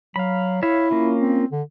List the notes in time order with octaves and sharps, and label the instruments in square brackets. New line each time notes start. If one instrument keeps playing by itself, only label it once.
[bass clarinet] F#3 [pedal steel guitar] F5 B5
[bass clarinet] E4 [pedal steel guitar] C#5 E5 F5
[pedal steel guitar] A#3 C#4 F4
[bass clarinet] C4
D3